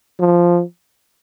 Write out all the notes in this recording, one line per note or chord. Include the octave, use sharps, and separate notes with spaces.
F3